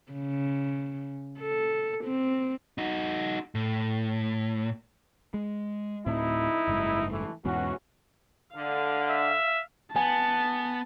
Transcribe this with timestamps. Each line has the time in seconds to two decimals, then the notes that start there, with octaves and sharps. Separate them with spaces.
0.13 C#3
1.39 A4
2.04 C4
2.78 D#4 F#4
3.55 A2
5.34 G#3
6.06 D1 F2 A2 C4 D#4 E4
6.68 F#1 G#2
7.11 E3 A3
7.45 E2 G#2 B2 E3 C#4 F#4
8.55 D3 F5
9.10 E5
9.96 B3 G#5 A5